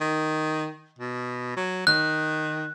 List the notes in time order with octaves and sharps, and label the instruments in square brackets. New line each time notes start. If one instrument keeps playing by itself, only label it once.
[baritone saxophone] D#3
B2
F#3
[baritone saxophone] D#3 [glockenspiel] F#6